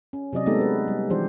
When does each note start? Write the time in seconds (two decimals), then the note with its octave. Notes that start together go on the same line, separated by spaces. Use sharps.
0.13 C#4
0.33 C3 F#3 D5 D#5
0.46 G#3 A3 B3 D#4 G4 A4
0.61 B4
0.88 G3
1.10 E3 F3 G3 D4 G4 C5